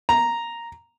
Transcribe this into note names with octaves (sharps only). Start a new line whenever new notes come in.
A#5